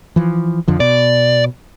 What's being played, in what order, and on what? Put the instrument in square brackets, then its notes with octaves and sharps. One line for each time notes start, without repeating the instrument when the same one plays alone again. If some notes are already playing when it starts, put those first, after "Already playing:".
[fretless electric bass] E3 F3
F2 D3 F3
[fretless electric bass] B2 [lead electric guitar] D5